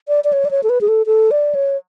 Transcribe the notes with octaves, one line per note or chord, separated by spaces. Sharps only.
D5
D5
C#5
D5
C#5
A4
B4
G#4
A4
A4
D5
C#5